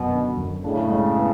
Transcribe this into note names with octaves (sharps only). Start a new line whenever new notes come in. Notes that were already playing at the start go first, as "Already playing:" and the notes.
Already playing: F#2 B2 F#3
D3
F#2
A2 C#3 D4
G#3
B3